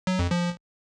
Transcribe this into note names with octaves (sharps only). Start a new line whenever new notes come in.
F#3
F2
F3